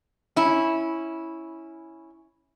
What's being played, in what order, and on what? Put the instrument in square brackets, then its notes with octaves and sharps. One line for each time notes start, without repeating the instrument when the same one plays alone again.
[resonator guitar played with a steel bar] C#4 E4